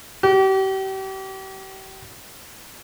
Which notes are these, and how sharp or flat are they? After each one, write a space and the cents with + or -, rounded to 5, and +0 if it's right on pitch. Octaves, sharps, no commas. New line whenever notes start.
G4 -35